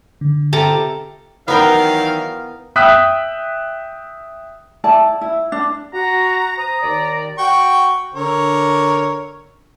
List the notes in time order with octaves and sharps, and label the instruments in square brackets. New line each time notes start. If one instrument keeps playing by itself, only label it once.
[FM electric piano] D3
[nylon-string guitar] C3 F4 G4 [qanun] A4 A5 A#5
[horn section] D#3 F#3 [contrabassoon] E3 [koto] B3 A#4 G5 [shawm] F5
[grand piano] E5 G5 D#6 F#6 B6
[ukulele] E4 D5 A5
E4
D4
[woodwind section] F#4 [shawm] A#5
[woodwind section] C5 D#6 [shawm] A#5
[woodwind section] D#2 D#3 D5
[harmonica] F#4 G5 C#6
D3 A#4 C#5